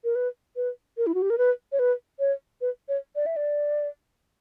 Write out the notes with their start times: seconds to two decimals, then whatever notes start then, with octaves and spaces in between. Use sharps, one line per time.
0.04 A#4
0.15 B4
0.56 B4
0.97 A#4
1.07 E4
1.14 F#4
1.22 G4
1.30 A#4
1.38 B4
1.72 C#5
1.79 B4
2.19 C#5
2.61 B4
2.88 C#5
3.16 D5
3.26 E5
3.36 D5